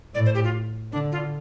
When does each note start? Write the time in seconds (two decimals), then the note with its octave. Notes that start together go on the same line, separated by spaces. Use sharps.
0.15 A2 D5
0.25 C5
0.35 G4
0.44 F4
0.92 D3 D4
1.12 F4